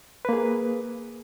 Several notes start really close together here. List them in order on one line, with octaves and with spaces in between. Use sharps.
B4 A#3 G#4